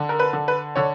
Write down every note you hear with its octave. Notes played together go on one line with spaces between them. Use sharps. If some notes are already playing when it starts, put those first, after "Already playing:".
Already playing: D3
A#4
B4
D3
B4
D3 C#5